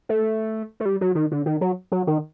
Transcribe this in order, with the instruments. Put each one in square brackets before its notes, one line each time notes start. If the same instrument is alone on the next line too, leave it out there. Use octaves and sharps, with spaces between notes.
[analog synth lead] A3
A3
G3
F#3
D#3
D3
D#3
F#3
F#3
D#3